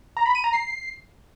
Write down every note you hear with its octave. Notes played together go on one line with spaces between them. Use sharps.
A#5
B5
D#7
A#5
C7